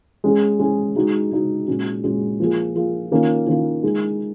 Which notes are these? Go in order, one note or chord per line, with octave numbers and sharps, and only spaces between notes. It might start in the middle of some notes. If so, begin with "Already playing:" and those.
G#3 C#4 G#4
G#3 C#4 G#4
G#3 D#4 F#4
G#3 D#4 F#4
A#2 G#3 C#4 F#4
A#2 G#3 C#4 F#4
F3 A#3 F4 G#4
F3 A#3 F4 G#4
D#3 A#3 C#4 F4
D#3 A#3 C#4 F4
G#3 D#4 G#4